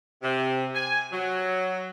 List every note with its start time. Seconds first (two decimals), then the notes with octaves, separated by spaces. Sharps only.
0.21 C3
0.73 G#5
1.12 F#3